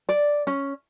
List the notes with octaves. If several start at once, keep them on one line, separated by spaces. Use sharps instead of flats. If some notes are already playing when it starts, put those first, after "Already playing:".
D5
C#4